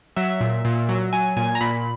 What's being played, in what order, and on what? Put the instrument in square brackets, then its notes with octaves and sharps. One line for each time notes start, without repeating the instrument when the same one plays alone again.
[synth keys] F#3 E5
A#2
A#2
F#3
F#3 G#5
A#2 G#5
A#5
A#2 B5